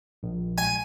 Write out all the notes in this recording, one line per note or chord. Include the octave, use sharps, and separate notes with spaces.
A#1
G#5